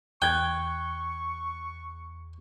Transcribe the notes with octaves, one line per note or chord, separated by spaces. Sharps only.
E2 G5 C#6 F#6 G#6